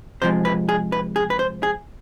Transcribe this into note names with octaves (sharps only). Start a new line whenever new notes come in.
C3 F3 G#3 C5
B4
G#4
B4
G#4
B4
C5
G#4